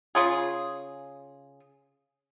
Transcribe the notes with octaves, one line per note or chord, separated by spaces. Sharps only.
C#3 F4 G#4